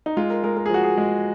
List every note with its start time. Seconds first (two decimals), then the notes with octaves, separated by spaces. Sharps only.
0.06 D#4
0.17 G#3 F4
0.30 A#4
0.43 G#3 A#4
0.57 A#4
0.66 G#4
0.70 F3 F#4
0.83 G#4
0.97 G#3